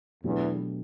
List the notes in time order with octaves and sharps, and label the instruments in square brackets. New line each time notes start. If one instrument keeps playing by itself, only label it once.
[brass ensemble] E2 [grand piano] B2 F#3 A3 D4 G4